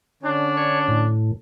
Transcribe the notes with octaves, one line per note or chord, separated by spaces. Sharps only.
D3 C#4 D4
C#5
A2